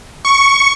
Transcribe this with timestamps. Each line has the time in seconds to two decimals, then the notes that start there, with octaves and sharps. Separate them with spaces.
0.25 C#6